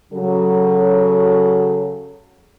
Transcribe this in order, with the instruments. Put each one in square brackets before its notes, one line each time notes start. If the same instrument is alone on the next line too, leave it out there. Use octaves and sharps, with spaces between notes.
[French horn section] C#3 F#3 A4